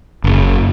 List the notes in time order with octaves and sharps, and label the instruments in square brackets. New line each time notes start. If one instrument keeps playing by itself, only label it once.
[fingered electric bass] F#1